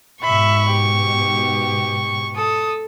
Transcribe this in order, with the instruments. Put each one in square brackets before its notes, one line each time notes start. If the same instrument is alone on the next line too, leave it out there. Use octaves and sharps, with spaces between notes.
[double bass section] G#2 B2 [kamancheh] E5 B5 [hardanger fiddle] C#6
[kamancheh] G4
[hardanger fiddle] A4 [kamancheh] D#6